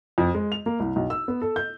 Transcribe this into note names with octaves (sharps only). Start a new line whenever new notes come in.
F2
G#3
F7
A#3
C2
B1
E6
B3
A4
G6